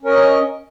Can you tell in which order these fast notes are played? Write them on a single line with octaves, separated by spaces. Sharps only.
C#4 A#4 D#5